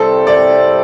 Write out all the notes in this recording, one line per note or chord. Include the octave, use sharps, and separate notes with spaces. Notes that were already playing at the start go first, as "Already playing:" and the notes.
Already playing: C2 C3 G3 C4 A4
D5